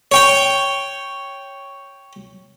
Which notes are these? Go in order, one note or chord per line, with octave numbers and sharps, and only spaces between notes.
C#5 G5